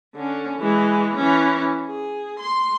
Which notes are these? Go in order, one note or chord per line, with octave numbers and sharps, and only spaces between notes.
D3 C#4
E3 G#3
E3 C#4
G#4
C6